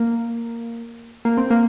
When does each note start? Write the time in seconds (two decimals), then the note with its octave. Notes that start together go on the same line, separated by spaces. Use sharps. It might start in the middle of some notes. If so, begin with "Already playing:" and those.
Already playing: A#3
1.25 A#3
1.38 C4
1.50 A#3